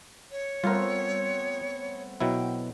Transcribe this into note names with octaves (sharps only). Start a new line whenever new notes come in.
C#5
G3 A3 B3 C4 F4 A#4
B2 F#3 E4 G5